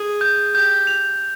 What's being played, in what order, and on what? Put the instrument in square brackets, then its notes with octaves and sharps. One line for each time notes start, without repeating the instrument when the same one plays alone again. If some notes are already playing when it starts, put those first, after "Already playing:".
Already playing: [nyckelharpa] G#4
[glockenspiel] G6
[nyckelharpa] G4 [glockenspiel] G6
[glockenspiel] F7